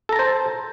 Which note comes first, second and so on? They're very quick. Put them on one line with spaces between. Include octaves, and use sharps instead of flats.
A4 A#5 A5 C5